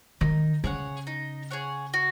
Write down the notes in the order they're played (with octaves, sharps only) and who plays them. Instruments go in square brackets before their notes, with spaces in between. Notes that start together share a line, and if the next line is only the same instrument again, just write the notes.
[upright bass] D#3 [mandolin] D#4
[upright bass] C#3 [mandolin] G#4 C#5 F#5
[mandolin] D#4
G#4 C#5 F#5
F#4